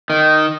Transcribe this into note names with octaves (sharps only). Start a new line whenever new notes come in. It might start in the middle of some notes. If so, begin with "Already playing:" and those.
D#3